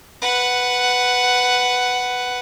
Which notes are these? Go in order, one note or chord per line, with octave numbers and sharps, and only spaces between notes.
B4 F#5